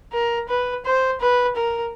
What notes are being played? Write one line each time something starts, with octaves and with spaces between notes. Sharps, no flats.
A#4
B4
C5
B4
A#4